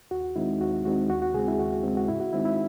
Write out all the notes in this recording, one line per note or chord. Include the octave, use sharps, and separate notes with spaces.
D#2 F#4
D#3 G#3 C4 D#4 E4
D#2 F#4
D#3 G#3 C4 D#4 F#4
D#2 F#4
F#4
C#3 G#3 C4 G#4
E4
D#2 F#4
C#3 G#3 C4
F#4
G#2 E4
F#4
D#3 G#3 C4 D#4 E4
E4